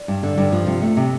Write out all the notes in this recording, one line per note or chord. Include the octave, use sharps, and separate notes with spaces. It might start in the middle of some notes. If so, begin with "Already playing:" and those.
Already playing: D5
G2
D3
G2
F3
C3
A3
C3